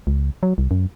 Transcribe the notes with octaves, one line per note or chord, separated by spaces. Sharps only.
C#2
F#3
C2
F#2